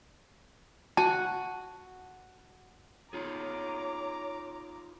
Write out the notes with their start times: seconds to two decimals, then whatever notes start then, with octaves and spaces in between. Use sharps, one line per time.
0.97 F#4 A5
3.13 D#4 F4 G#4 C#5 A#5 D6